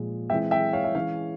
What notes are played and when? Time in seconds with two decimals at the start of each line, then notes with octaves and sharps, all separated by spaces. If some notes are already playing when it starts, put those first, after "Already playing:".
Already playing: A#2 F3 G#3
0.30 E3 G#3 C4 E5 G5
0.51 E5 G5
0.73 C#5 F5
0.84 E5
0.95 E3 G#3 C#4 C#5 F5